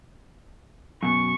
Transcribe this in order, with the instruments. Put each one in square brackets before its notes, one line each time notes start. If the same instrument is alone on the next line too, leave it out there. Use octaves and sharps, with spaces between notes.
[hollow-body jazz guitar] F#2 B2 [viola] C#6